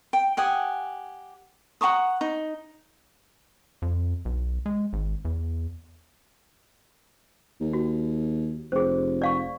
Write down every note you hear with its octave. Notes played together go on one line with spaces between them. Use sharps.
G5
G4 F#5 G#5 D#6
F#5 A#5 C#6 D#6
D#4
F2
B1
G#3
G#1
E2
D#2
F#4
F1 G#4 C5
D5 F5 C#6